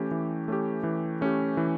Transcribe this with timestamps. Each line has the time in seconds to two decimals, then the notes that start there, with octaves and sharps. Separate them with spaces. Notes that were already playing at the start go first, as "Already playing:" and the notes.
Already playing: E3 A3 C#4 G4
0.11 E3
0.48 A3 C#4 G4
0.83 E3
1.21 A3 C#4 G4
1.57 E3